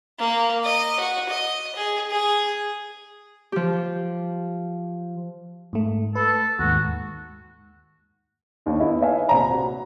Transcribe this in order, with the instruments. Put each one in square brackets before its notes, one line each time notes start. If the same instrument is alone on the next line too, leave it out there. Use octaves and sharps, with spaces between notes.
[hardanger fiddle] A#3
D#5
F#4
D#5
G#4
G#4
[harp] F3 G4
[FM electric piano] G#2 A3
[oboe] A4 [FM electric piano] B4
[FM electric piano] D#2 G#2 [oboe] F#4
[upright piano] D#2 D4 D#4
B3 E4 D#5
B4 C#5 E5 F5 G#5
A#1 C3 C5 D5 A#5 B5
F#4